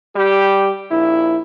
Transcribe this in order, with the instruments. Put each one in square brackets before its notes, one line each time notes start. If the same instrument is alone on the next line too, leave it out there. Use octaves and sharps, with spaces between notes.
[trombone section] G3 G4
A#1 E4